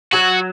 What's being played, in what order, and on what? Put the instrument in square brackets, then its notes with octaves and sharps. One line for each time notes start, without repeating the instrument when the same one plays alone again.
[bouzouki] F#3 [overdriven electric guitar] F#4